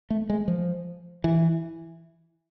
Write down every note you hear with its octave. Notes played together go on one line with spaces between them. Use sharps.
A3
G#3
F3
E3